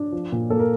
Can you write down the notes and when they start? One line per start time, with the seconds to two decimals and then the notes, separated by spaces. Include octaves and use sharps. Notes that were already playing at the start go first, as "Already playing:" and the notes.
Already playing: D4
0.12 F3
0.32 A#2
0.50 A#3 A4
0.59 A#4